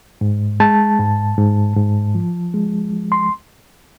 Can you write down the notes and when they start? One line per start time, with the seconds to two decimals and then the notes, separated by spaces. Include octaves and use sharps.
0.21 G#2
0.60 G#3 A5
0.99 G#2
1.37 G#2
1.76 G#2
2.15 F3
2.54 G#3
2.93 F3
3.12 C6